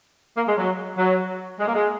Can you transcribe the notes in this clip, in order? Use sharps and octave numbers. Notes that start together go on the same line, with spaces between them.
A#3
G#3
F#3
F#3
G#3
A#3
G#3